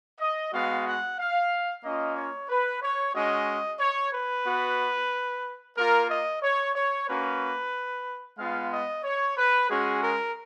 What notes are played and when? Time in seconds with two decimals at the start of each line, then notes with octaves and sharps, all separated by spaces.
0.19 D#5
0.52 G#3 B3 F#4 F5
0.86 F#5
1.18 F5
1.83 A#3 C#4 F4 D#5
2.16 C#5
2.49 B4
2.82 C#5
3.14 G#3 C#4 F#4 D#5
3.80 C#5
4.13 B4
4.45 B3 F#4
5.76 A#3 F4 A#4
6.09 D#5
6.42 C#5
6.75 C#5
7.07 A#3 C#4 F#4 B4
8.38 G#3 B3 F4 F5
8.71 D#5
9.03 C#5
9.36 B4
9.69 G#3 C#4 F#4 G#4
10.02 A#4